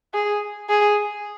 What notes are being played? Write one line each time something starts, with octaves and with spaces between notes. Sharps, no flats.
G#4
G#4